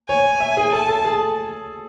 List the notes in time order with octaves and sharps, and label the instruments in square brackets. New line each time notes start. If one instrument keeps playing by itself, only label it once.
[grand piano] C#5 [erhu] G#5
[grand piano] E5
G#4
[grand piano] A4 [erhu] A5
[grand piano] A4
G#4